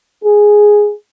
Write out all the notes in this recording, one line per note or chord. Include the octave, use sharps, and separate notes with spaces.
G#4